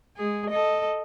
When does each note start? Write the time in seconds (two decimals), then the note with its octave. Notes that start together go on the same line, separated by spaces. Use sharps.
0.16 G#3 G#4
0.50 A4 D#5